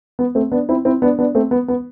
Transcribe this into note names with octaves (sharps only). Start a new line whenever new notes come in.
B3
A3 C4
B3 D4
C4 E4
C4 E4
B3 D4
B3 D4
A3 C4
B3
B3